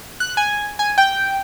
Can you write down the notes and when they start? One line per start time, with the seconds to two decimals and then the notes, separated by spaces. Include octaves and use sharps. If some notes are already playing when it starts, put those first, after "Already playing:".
0.20 F#6
0.37 G#5
0.79 G#5
0.98 G5